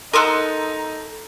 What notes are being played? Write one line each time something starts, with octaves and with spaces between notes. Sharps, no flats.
D#4 A4 A#4 F#5 C6 D#6